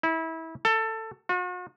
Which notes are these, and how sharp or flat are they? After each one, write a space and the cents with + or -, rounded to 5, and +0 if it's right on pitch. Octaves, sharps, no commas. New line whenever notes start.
E4 -25
A4 +20
F#4 -45